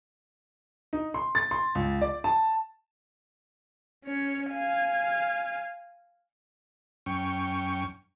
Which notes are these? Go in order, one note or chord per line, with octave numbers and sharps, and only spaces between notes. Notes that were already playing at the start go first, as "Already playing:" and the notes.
D#4
C6
A6
C6
C#2
D5
A5
C#4 C#5
F5 G#5
F#2 C#4 G5 C#6